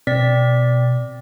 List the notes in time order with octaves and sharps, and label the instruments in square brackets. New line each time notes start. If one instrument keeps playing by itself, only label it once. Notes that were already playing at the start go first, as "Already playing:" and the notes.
[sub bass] B2 [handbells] C4 D5 B6